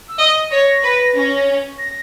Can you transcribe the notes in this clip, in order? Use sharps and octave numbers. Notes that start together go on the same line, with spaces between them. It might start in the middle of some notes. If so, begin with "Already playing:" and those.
E6
D#5
C#5 A#6
B4
C#4
A#6